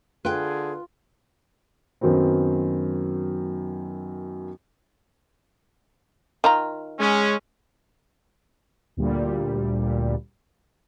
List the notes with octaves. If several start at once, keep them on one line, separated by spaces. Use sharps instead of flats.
D3 F4 G#4 B4 G5
F#2 D#3 F#3 B3 C4
D#3 F4 A#5
G#3 C#4
D2 A#2 G3